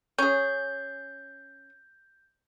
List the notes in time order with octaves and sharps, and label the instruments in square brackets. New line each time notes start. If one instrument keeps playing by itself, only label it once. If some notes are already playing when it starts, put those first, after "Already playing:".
[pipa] C#4 G#4 [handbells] G6